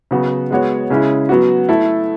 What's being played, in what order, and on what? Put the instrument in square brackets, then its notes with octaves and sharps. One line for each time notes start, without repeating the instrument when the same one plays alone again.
[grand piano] C#3 F#3 B3 F#4
G#3 B3 F#4 C#5
C#3 G#3 C#4 E4
F#3 B3 F#4
A3 E4 A4